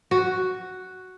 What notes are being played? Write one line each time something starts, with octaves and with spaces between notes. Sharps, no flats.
F#4